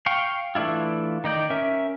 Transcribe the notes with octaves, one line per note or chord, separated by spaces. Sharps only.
F5 G5 C#6
E3 A3 D4 E4 F4
D#3 D#4 D5 G6
C#4 A#4 E5